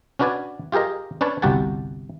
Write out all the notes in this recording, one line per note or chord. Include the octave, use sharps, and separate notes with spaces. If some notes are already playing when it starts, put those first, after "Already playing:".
C#4 D4 F#4 B4 D5 G#5
F4 G4 G#4 A#4 D#5
C#4 D4 B4 C#5 A5
G1 C2 F#4 G4 F#5 A5